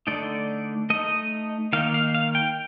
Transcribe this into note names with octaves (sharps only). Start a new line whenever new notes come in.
D3 A3 D#4 D5
A3 D#4 D#5
D#3 A#3 D#4 F5
F5
F5
G5